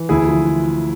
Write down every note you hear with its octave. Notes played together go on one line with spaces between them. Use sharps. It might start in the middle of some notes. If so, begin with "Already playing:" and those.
Already playing: E3
D2 E4 G#4
F3